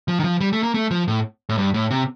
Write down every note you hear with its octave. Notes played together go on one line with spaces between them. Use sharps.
F3
D#3
F3
G3
A3
A#3
A3
F3
A2
A2
G2
A2
C3